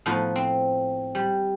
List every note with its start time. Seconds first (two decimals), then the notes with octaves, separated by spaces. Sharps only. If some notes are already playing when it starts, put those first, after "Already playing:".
0.06 A2 F3 B3 D#4 F4 B4
0.36 C4
1.15 G3